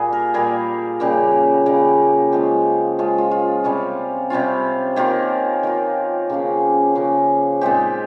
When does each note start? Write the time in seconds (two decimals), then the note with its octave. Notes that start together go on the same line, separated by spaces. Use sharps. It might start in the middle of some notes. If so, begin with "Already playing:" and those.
Already playing: A#2 G3 A#3 G#4
0.13 A#4
0.34 A#2 G3 A#3 G#4
1.00 C#3 G3 A#3 G4
1.66 C#3 G3 A#3
2.32 F3 G#3 C#4 G4
2.98 F3 G#3 C#4 F4
3.18 F4
3.31 F4
3.64 C3 G3 C#4 F4
4.30 C3 G3 C#4 F4
4.96 D#3 A#3 F4 G4
5.63 D#3 A#3 F4
6.30 C#3 F3 A#3 C#4
6.95 C#3 F3 A#3 C#4
7.61 A#2 G#3 C4 D#4 G4